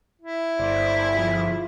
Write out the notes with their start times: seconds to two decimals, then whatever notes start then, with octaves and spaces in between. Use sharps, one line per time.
0.21 E4
0.59 G1 C5 D5
1.15 G1 F3 F4 G#4 E5